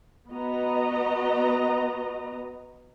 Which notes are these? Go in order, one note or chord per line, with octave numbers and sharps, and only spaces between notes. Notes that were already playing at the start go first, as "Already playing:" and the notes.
B3 F#4 D#5 A#5